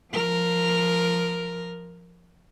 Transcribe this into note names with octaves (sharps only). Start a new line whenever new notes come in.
F3 A#4